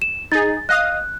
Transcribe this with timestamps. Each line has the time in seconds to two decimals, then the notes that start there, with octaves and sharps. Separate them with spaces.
0.02 E7
0.32 D#4 G#4 A6
0.69 D#5 F5 D#6 F#6